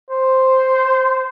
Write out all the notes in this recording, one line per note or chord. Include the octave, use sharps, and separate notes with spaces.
C5